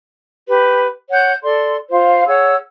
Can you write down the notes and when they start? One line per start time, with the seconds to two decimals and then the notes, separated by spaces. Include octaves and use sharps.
0.48 G4 B4
1.11 C#5 F#5 G6
1.43 A4 D5 C6
1.90 F4 C5 F5
2.27 G#4 C#5 F#5 E6